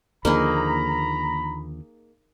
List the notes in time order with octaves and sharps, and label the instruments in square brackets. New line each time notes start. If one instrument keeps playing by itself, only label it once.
[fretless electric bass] D#2 D3 F3 [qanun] A#3 D#4 G#4 [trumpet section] A#5 B5